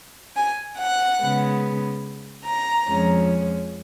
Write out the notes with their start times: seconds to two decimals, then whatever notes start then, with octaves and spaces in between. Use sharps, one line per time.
0.37 G#5
0.79 F#5
1.20 C#3 G#3 B3
2.45 A#5
2.87 F2 F3 G#3 C#4